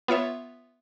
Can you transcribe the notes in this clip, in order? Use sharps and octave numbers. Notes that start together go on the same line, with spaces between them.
B3 F4 C#5 E5